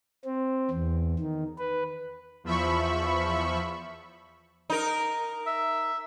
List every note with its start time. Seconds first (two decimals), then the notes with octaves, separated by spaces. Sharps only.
0.25 C4
0.71 E2
1.19 D#3
1.58 B4
2.44 E2 F3 E5 B5 C#6
4.70 D#4 A#4
5.47 E5